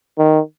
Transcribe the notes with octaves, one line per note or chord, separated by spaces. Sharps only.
D#3